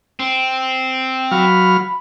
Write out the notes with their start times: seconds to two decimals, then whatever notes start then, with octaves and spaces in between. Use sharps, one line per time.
0.20 C4
1.31 F#3 F5 B5